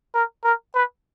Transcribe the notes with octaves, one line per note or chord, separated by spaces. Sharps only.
A#4
A#4
B4